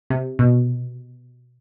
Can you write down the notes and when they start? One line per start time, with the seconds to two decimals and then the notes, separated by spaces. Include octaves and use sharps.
0.10 C3
0.39 B2